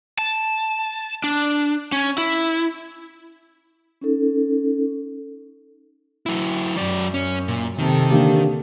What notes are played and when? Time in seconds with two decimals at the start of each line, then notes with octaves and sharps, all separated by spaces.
0.18 A5
1.24 D4
1.92 C#4
2.18 E4
4.01 C#4 D#4 A4
6.26 F#3 E4
6.76 F#2 F#3 D5
7.14 C#4
7.48 A#2
7.79 C3 D#3 A4
8.10 D3 A#3 G4